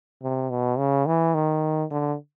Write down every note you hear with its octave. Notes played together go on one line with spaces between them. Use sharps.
C3
B2
C#3
E3
D#3
D3